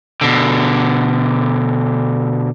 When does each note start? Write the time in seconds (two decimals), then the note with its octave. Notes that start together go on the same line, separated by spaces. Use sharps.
0.21 B2 D3